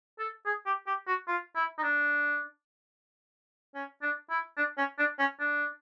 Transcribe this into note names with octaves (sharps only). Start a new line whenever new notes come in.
A4
G#4
G4
G4
F#4
F4
E4
D#4
D4
C#4
D4
E4
D4
C#4
D4
C#4
D4